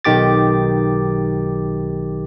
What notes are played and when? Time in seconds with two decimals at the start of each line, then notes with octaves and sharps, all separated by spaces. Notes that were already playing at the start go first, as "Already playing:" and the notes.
0.05 B1 D#3 G4 D6 A6